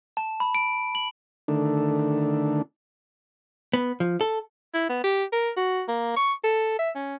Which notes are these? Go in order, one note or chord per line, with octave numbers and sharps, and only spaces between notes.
A5
B5
D7
F#7
D3 D#3 A3 D4
B3
F3
A4
E4
B3
G4
A#4
F#4
A#3
C#6
A4
E5
C#4